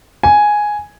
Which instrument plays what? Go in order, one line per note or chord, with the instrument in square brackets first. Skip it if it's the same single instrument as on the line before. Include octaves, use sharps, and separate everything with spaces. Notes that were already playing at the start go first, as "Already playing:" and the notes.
[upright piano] G#5